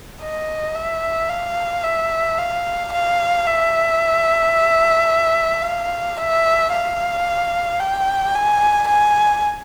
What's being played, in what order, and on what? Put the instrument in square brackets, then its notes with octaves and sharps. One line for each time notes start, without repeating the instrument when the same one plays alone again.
[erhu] D#5
E5
F5
E5
F5
F5
E5
F5
E5
F5
G5
G#5
G#5